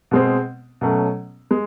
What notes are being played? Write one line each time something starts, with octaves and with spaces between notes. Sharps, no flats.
B2 G#3 C4
B2 F#3 A3 C#4
G#3